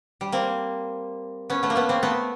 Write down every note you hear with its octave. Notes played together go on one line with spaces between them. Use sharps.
G3
A#3 C4
B3 C#4
A3 B3
A#3
A3 B3
A#3 C4
A3 B3